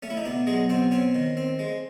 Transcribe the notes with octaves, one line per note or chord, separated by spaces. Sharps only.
A3 C#4
E4
D#4
B2 D4
F#3 G#3 G#4
B2 C4 C5
C4 C#4 C#5
D#3
C4
G#3